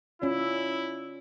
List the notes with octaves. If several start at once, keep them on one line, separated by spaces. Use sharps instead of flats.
C#4 E4 F4 D5